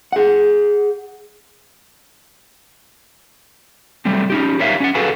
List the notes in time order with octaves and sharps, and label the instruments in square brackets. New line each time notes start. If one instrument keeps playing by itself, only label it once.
[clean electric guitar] G#4 F#5
[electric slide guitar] F#3 G3 A3 C4
C#4 D#4 G4
D#4 G4 A#4 C#5 E5 F5
C#4 D5 F#5
F#4 G#4 A4 B4 F5 G#5